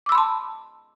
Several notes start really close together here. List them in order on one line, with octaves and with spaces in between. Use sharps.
D6 E6 B5 C6 A5